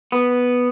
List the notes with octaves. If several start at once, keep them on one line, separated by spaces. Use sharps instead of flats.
B3